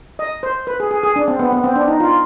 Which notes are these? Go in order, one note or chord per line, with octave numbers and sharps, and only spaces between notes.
D#5
C5
B4
G#4
G#4
G#4
D4
C4
B3
B3
C4
D4
D#4
F4